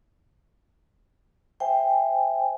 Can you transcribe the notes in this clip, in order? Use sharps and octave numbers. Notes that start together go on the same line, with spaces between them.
C5 E5 G5 G#5